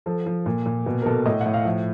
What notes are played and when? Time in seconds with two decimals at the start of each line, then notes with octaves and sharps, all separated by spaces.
0.06 F3 A4
0.26 F3
0.46 A#2
0.66 A#2
0.86 B2
1.02 A#4
1.06 B2 A4
1.26 A2 D#5
1.41 A2 F#5
1.54 F5
1.65 F3 E5